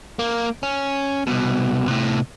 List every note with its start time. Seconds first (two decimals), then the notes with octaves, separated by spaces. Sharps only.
0.19 A#3
0.63 C#4
1.27 C2 B2
1.88 A2 C3